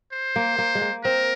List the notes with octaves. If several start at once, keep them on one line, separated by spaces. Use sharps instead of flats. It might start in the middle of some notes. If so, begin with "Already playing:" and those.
C5
A#3
A#3
G#3
A#3
C4 A#4